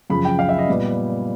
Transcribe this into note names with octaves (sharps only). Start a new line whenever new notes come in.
F#2 C#3 F3 B5
G5
F5
E5
D#5
A#2 G3 B3